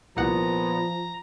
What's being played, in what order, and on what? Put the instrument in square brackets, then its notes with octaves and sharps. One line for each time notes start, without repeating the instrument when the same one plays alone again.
[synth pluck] C2 F#5 [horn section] A#2 B3 [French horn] F3 [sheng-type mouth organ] A#5